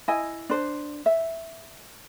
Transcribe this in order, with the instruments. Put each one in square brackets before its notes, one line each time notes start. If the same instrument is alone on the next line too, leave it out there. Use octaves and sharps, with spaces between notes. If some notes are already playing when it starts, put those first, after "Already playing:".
[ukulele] E4 D#5 G#5
D4 C5
E5